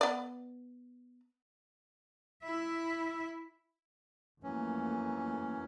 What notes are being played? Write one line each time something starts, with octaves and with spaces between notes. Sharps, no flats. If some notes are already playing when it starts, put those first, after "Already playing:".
B3 D5
E4 E5
F2 E3 F#3 A3 A#3 C#4